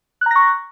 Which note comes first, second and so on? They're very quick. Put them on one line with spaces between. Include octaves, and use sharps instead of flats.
F#6 A#5 A#6 C#6